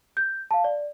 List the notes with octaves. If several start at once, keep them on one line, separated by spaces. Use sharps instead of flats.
G6
F5 A5
D5